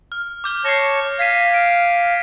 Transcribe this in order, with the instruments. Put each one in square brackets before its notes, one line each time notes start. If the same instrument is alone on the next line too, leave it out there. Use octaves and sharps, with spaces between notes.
[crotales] F6
D6 G6 G7
[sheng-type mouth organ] C#5 A5 C#6 [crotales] A#6 C7
[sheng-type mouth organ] F5 [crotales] G#6 B6 D#7
[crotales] D7